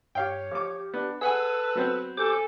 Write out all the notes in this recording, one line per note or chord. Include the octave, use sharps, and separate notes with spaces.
G2 G4 C#5 F5 G5
F3 G4 D6
B3 D4
G#4 A4 B4 F#5 G#5 E6
F#3 B3 C4
G4 A4 C5 G#5 D6